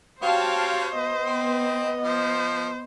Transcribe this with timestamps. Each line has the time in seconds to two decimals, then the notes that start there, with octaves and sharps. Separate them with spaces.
0.22 C4 F#4 G4 C5 C#5 F5 A5
0.93 B3 D#5
1.26 C4
2.04 F3 C5